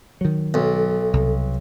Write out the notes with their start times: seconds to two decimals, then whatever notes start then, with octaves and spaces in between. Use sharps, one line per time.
0.21 D#3 F#3
0.54 B1 A4
1.13 C2